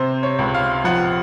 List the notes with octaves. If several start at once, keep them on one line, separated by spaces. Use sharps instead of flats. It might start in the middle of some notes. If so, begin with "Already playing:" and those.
Already playing: C3 C5
C#5
C#2
F5
F3 F#5